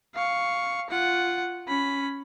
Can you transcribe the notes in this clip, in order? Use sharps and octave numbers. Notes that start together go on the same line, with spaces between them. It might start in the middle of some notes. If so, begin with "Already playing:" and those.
F5 C#6
F4 F#5
C#4 B5